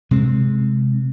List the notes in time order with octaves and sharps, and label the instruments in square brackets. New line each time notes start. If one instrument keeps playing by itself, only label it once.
[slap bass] C3 G#3 C4